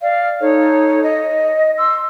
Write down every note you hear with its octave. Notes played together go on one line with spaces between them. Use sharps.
D5 F5
D#4 A4 C#5
D#5
C6 E6